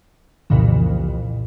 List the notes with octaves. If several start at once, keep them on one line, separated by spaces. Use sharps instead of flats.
C2 F2 A#2 C#3 E3